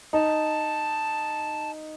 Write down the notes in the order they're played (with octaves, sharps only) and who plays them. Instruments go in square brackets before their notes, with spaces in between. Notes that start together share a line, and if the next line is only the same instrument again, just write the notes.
[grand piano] D#4 [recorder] A5